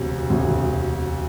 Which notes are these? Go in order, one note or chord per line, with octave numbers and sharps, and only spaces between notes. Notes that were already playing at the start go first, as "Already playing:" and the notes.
Already playing: E1 D2 C3
E1 D2 C3